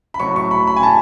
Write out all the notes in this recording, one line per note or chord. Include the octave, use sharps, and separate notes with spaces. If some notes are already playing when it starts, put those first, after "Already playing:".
B5
A2 F#3 C#6
C#6
B5
B5
G#5
A5